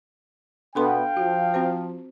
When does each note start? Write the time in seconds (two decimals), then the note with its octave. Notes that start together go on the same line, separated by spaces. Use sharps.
0.75 B2 B3 D4 A4 F5 G5 C6
1.17 F3 F#4
1.54 C4 F#4 C5